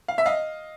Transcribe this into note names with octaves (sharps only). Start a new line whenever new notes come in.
F5
E5
D#5 F5